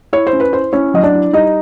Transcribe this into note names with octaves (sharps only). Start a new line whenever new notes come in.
E4 C#5
C5
C#4
B4
E4 C5
C#4 E4 C#5
F#3 D#5
D4 D5
E4
G3 D#4 D#5